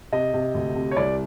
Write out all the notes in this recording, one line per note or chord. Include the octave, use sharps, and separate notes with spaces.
C3 D#5
C3
D2
C3
C#5
C2 D5